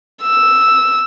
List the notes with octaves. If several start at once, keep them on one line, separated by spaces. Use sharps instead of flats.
E6